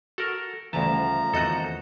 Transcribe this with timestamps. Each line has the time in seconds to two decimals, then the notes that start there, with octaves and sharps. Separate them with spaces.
0.18 F#4 A4 A#4
0.73 D2 C#3 E3 F3 G3 A3 A5 A#5
1.34 E2 D#3 E3 C4 F#4 A4 D#5 G6